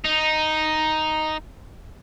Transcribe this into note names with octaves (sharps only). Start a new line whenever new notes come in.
D#4